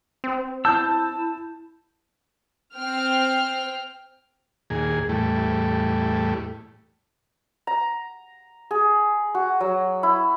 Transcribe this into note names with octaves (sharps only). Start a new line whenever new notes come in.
C4
E4 A5 E6 G6
C4 G5 F6
D#2 A#2 G#4
E2 A2 G3 A3
A#5
G#4
F#4
F#3
E4